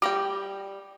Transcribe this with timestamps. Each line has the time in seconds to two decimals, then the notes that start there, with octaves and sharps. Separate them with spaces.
0.02 G3 G5 D6 A#6